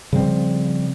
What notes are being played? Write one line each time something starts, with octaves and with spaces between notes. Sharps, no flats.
C#3 F3 G3 C4